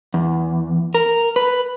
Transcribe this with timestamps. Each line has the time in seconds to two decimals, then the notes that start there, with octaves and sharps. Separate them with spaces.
0.14 E2
0.94 A#4
1.36 B4